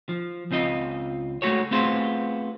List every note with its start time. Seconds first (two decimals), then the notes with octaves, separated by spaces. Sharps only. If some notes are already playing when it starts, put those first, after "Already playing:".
0.09 F3
0.51 C#2 C4 F4 D#5
1.42 G#3 A3 B3 F#4 A4 C#5
1.71 A3 B3 C4 F4 G#4 C5